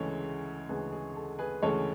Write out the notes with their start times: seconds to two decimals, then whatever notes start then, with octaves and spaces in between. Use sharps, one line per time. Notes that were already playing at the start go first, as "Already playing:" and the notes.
Already playing: D2 C#3 E3 G#3 A4 C#5
0.69 D2 C#3 E3 G#3 G#4 B4
0.92 G#4
1.16 A4
1.39 G#4 B4
1.63 D2 C#3 E3 G#3 A4 C#5